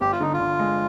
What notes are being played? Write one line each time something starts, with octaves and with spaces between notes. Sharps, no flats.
G1 G4
F4
D3 D#4
F4
D3
G#3